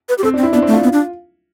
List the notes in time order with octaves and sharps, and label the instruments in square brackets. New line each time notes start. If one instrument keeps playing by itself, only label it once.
[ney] B4
G4
[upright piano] C4 [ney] A4
[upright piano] D4
[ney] C4
[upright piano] E4
[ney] B3 [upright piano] D4
[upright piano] C4
[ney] A3
[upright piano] F4
[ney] B3
D4